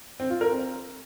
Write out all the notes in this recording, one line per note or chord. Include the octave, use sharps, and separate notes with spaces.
C4
F4
A#4
C4